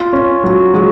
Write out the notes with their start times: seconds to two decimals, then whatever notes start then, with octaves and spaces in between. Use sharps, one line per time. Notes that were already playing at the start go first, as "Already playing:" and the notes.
Already playing: F4
0.13 C#4
0.44 F#3
0.74 F#3 G#3